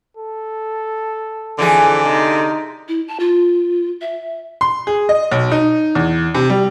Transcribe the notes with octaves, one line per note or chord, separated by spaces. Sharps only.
A4
F2 D3 E3 G#4
C3 D#4
E4
A5
F4
E5
C6
G#4
D#5
B1
D#4
E2
C3
G3